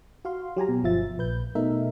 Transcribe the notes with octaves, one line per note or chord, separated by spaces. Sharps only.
F#4 F5 C6
F#3 G4 G#5 A#5
B2
G1 F3 F4 E5 A6
A#1 B4 G6
B2 A3 D#4 A#4 E5